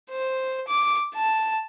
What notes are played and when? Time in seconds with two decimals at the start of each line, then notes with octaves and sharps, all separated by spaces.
0.11 C5
0.68 D6
1.15 A5